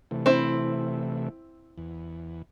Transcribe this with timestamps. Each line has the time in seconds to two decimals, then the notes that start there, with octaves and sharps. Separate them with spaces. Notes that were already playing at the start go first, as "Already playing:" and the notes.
0.11 C3 E3 A3
0.26 C4 E4
1.78 E2